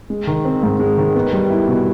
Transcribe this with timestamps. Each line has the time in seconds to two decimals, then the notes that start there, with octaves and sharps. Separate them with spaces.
0.10 G#3
0.27 D#3
0.45 C4
0.63 G#2
0.79 G#3
0.98 D#3
1.15 B3
1.33 G3
1.50 E4
1.68 B2